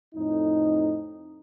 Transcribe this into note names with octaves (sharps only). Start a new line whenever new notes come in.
F2 A2 D#4